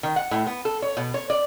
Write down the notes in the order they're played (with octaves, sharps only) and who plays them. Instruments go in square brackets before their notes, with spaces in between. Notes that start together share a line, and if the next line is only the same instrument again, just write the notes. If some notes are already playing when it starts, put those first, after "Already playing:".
[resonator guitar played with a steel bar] D#3
F#5
A2
B3
A4
C#5
B2
C#5
D5